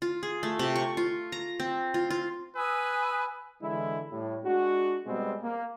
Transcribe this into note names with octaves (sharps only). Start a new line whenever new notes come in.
F4
G#4
A3
C3
C#6
F4
A#5
C4
F4
F4
B4 G#5 D#6 E6
D3 E3 G#3 E4
A2 G3
G#3 D4 F#4
B2 G3 G#3 B3 C4
A#3